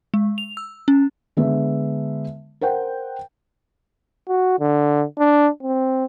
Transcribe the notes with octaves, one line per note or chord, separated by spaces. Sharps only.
G#3
F7
E6
C#4
D3 G#3 B3 E5
A#4 C5 F#5 G5
F#4
D3
D4
C4